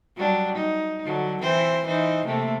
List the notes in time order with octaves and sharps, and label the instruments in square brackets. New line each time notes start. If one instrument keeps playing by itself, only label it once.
[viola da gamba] F#3 G3 D4
D#4
D3 F#3
E3 C4 C5
E3 D#4 C5
C3 A3 A#3